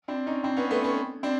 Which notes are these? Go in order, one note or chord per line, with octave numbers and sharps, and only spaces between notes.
C4 D4
C#4 D#4
C4 D4
B3 C#4
A3 B3
B3 C#4
C4 D4